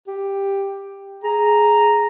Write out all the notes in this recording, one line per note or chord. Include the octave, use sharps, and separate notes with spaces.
G4
G#4 A#5